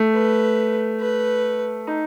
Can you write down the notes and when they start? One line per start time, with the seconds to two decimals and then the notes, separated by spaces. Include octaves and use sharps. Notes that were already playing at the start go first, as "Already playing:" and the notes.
Already playing: A3
0.14 B4
1.00 B4
1.87 D#4